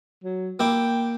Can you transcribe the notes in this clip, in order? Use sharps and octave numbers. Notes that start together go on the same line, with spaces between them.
F#3
A#3 E4 G5 D6